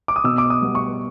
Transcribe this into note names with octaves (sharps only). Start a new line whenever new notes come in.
D6
D#6
B2 E6
D6
D#6
G3 B3
C#6